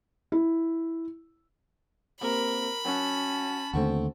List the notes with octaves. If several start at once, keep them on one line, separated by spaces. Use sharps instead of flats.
E4
C3 A#3 A#4 B5
F#3 C#4 F#5 A5
D#2 D3 A3 C4 F#4